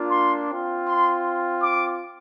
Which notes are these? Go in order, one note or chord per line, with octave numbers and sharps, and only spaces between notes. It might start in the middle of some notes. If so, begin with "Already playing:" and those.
Already playing: A#3 D4 F4
C6
C4 F4
C6
D6